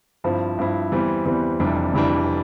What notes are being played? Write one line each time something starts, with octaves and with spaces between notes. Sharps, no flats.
G2 F3 C4 E4
G2 F3 C4 E4
E2 E3 G3 C4
E2 E3 G3 C4
F1 F2 E3 G3 D4
F1 F2 E3 G3 D4